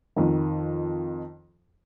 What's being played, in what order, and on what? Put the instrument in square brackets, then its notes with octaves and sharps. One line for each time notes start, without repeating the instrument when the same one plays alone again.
[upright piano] F2 D#3